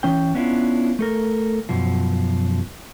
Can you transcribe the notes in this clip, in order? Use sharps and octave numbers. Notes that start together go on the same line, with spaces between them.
E3 C#4 G5
B3 C#4 D4 E4 F4
A3 A4 A#4
F#2 B2 F3